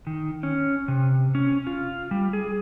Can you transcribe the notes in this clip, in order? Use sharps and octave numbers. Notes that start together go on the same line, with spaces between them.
D#3
C#4
C3
C#4
F4
G3
G#4